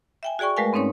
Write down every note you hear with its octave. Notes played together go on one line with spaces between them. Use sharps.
E5 G5 G#5
F#4 G#4 D5 G5 C#6
G#3 A3 A#4 B4 F5 G#5
G#2 C4 C#4 D#4 C#5 C6